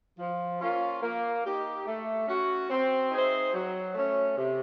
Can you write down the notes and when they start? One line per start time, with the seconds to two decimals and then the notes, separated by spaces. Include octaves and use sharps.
0.19 F3
0.61 A#3 C#4 F4
1.03 A#3
1.45 D#4 G4
1.86 A3
2.28 C#4 F#4
2.70 C4
3.12 D#4 G#4 C5 E5
3.53 F#3
3.95 A3 C#4
4.37 C3